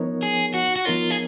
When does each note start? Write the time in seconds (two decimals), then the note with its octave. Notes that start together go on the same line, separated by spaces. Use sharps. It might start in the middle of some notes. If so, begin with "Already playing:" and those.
Already playing: F3 B3 D#4 A#4 C#5
0.23 G#4
0.54 F#4
0.76 F#4
0.85 F3 B3 D#4 F4 A#4 C#5
1.10 G#4